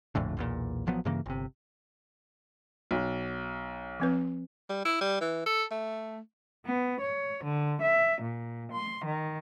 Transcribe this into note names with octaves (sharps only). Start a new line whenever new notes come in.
A#1 F2 A2 D3
B1 E2 A#2
A1 F3 F#3 B3
G2 C#3 E3 A#3
G1 C3
B1
F3 C4 B4
G3
E4
G3
E3
A4
A3
B3
C#5
D3
E5
A#2
C6
D#3